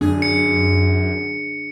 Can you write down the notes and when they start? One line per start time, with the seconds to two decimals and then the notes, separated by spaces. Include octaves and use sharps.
0.01 F#2 D4 G#4
0.22 C#7